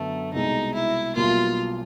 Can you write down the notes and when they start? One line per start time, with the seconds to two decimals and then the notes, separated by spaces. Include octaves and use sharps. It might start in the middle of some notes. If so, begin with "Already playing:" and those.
Already playing: F#2 D3 F#3 A3 B3
0.33 C2 B2 G#3 D#4
0.74 E4
1.15 B1 B2 G3 A#3 F4